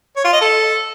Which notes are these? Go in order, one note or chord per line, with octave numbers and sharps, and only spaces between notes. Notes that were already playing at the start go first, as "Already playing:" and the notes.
C#5
F4
D#5
A4